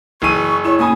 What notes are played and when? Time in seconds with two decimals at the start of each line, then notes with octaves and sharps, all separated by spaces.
0.22 F#1 E3 C#6 D#7
0.65 E4 C#5 C#6 E7
0.79 C#3 A#3 G#5 B5 D#6